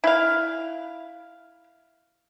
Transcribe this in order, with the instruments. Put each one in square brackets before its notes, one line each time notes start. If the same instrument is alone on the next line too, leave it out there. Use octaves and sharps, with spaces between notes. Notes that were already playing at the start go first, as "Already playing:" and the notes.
[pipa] E4 F5